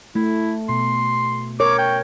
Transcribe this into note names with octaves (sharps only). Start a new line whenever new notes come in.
A3 E4
B2 C6
A#4 C#5 D6
G5